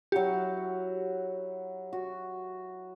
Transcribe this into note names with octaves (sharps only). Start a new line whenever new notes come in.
F#3 E4 F#4 G4
F#4